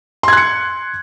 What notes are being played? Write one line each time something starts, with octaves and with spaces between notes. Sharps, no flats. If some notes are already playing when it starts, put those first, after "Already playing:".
C6 F#6 G#6 C#7